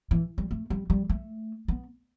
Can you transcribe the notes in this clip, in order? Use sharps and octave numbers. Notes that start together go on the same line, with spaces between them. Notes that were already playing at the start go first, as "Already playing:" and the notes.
E3
G3
A3
G3
G3
A3
B3